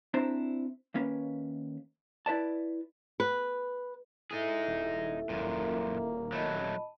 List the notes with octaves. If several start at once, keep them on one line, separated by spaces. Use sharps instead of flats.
C4 D4 E4 C5 A#5
D#2 A#3 C#4 B4
E4 B4 D5 A5
B4
D#4 E4 G#4 A4 E5
D#1
D#1 F#2 A#2 A#3
F#3 A3 D#5 A5 B5